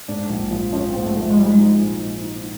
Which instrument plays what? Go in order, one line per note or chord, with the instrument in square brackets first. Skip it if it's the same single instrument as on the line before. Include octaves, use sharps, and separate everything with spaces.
[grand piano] G#2 [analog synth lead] D4
[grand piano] A#1
F3
[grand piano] F3 [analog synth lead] C#4
[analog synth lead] C4
[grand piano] G#2
[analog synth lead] A3
[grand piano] F3
[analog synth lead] A3
G#3
[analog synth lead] G3 [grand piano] D#4
[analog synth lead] G#3
[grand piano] D#4
A#2
D#4
D#4